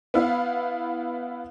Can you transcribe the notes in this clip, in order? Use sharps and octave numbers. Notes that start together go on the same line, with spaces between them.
B3 E4 F5